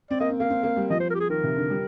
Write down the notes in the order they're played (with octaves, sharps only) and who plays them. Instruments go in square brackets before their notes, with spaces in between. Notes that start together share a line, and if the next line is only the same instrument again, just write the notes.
[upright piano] C4 [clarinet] D5
[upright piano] A#3 [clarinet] D#5
[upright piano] C4
[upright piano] A#3 [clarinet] F5
[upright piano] C4
A#3
G3
[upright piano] F3 [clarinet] D#5
[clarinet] C5
A#4
G4
G#4
[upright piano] D#3 [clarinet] A#4
[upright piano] C3
D3
G3